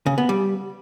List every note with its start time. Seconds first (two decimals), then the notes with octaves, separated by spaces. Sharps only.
0.06 C#3
0.18 B3
0.29 G3